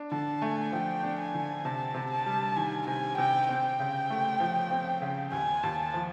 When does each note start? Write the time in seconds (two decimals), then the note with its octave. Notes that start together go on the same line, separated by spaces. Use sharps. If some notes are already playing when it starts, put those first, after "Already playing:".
Already playing: D4
0.12 D3 A5
0.42 A3 G#5
0.72 F3 G5
1.03 D4
1.19 G#5
1.34 D3
1.65 C3 A5
1.95 C3
2.11 A5
2.26 G3
2.56 D#3 G#5
2.87 C3 G#5
3.17 C3 G5
3.48 C4 G5
3.80 C#3
4.10 A3
4.40 F3
4.71 C4
5.02 C#3
5.32 D#2 G#5
5.63 D#2 A5
5.94 F3